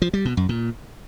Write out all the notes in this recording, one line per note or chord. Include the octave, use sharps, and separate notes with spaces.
F3
G3
B2
F#2
A#2